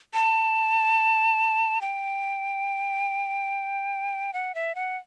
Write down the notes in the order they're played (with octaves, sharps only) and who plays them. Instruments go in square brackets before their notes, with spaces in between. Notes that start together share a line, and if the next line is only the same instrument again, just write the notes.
[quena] A5
G5
F#5
E5
F#5